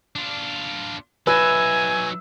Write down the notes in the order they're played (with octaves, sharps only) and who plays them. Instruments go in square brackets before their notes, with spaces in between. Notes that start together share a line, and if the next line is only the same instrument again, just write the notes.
[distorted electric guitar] D4 F4
[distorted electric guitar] F#3 D#4 [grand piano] B4 [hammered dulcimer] E5 [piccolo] G#5